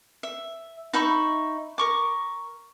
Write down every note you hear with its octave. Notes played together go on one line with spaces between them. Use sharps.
E5
D#4 E5 B5 C#6
A#4 C#6 D6